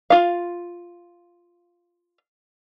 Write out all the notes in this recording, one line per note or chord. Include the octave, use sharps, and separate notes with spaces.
F4 F5